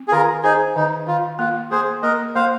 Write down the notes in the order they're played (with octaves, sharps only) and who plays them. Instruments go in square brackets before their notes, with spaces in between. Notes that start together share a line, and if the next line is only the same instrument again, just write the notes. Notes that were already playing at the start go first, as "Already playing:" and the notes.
Already playing: [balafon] C4
[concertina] G#4
[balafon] D#3 [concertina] F4 A#4
[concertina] D#4 G#4 [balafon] C5
[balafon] D#3 [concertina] D#4
[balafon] D#3 [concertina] F4
[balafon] A#3 [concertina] F4
[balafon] A#3 [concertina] G#4 C5
[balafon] A#3 [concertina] A#4 D#5
[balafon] A#3 [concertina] C5 F5